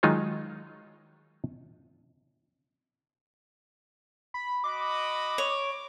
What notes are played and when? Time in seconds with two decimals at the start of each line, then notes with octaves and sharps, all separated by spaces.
0.03 D#3 F#3 G#3 D#4 F4 G#4
4.34 B5
4.64 F#4 D#5 B5 D6
5.38 C#5